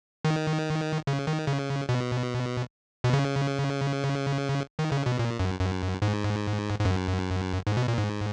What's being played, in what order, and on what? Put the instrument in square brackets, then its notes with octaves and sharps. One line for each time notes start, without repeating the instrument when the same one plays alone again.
[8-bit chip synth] D#3
C#3
D#3
C#3
B2
B2
C#3
D#3
C#3
B2
A#2
F#2
F#2
G#2
G#2
F#2
G#2
B2
A#2
G#2